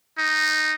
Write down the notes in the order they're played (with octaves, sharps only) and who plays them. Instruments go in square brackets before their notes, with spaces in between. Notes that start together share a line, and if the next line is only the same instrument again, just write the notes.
[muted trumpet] D#4